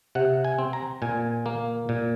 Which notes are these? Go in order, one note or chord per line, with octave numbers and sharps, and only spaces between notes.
C3 F#5
G#5
C4
A#5
A#2 G#5
A#3
A#2